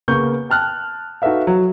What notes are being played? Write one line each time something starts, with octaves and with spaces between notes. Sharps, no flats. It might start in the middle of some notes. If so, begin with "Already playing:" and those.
C#3 A#3 B3 C#6 G6
G5 A5 F6 F#6
D#4 F#4 A4 B4 E5 F5
F#3